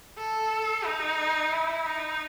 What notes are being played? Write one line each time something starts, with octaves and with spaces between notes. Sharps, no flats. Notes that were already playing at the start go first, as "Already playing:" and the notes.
A4
D#4
E4
D#4